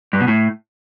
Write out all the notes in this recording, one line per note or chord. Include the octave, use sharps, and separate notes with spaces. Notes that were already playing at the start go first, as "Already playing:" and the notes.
G2
B2
A2